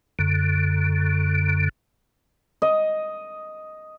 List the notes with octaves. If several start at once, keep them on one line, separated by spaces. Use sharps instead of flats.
F#2 D3
D#5